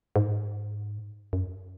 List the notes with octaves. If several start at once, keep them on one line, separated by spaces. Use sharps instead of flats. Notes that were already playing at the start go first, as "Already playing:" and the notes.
G#2
F#2